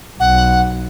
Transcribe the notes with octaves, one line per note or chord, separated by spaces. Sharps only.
B1 F#5